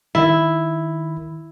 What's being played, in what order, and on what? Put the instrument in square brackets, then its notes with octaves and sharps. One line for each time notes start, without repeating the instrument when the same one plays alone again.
[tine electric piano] D#3 B5 [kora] E4